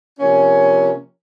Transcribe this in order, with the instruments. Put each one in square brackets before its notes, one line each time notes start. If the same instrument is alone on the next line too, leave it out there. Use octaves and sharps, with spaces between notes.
[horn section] C3 F3 A#3 C#4